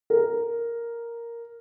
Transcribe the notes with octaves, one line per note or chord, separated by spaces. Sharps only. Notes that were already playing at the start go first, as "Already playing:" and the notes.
A#4